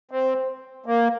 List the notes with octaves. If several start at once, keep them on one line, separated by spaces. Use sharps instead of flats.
C4
A#3